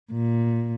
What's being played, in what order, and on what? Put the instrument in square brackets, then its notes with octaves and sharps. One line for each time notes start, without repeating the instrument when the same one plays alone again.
[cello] A#2